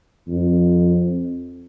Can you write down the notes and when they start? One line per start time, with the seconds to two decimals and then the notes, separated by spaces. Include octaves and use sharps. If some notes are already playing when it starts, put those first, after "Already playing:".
0.28 F2